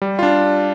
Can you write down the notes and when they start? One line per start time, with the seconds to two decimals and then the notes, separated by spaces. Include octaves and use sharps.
0.02 G3
0.19 D4 F4